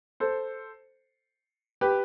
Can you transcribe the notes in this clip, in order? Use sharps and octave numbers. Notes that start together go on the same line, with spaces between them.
A4 C5
G4 B4